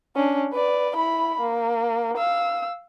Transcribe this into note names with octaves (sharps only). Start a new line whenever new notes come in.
C#4 D4
B4 D5
E4 B5
A#3
F5 E6